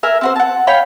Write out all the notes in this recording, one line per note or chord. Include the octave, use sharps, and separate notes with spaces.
A#4 E5 G#5
C4 F#4 C5
F#5 A5
C#5 F5 G5 B5